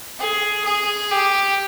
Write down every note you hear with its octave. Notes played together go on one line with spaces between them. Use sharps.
G#4
G#4
G4